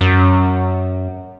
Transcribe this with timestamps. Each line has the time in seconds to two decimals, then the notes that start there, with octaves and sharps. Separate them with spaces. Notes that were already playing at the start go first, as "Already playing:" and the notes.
0.01 F#2